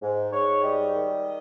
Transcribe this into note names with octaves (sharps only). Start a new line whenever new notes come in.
G#2
G#2 C#5
G3 D#5
D#3